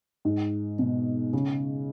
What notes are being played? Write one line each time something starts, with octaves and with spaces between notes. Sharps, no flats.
G#2
B2
C#3